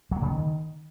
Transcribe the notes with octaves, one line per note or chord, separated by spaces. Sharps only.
F#3
A#3
C#3
D#3